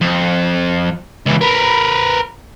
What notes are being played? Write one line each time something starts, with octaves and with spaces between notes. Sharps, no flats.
F2
C#2 E3
A#4 B4